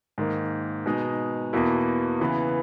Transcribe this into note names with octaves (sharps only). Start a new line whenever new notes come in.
G#2 D#3 A#3
B2 G#3 D#4
E2 B2 A#3 E4
C#3 E3 B3 E4